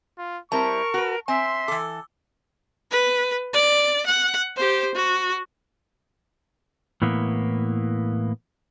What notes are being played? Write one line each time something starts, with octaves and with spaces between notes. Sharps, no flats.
F4
G3 C4 E4 A#4 A5 C#6
F#4 B4
C4 E5 G#5 C6
E3 A4 D6 E6
B4
D5
F#5
G4 C5
F#4
A2 E3 A#3 B3